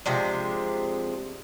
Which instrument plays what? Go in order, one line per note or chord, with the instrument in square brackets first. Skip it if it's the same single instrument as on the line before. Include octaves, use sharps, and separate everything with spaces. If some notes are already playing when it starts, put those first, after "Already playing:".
[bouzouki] C3 F3 G#3 D4